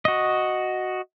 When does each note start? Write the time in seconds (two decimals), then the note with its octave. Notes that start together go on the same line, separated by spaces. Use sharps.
0.05 F#4 D#5